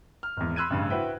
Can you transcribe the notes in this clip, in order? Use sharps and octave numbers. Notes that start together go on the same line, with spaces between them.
F6
G#1 E2
B5 C6 E6 F#6 G#6 D#7
A1 G2 C#3
E4 F#4 B4 C5 E5 G5